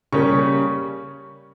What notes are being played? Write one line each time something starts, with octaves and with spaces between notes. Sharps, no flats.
C#3 G3 A#3 C#4 C#6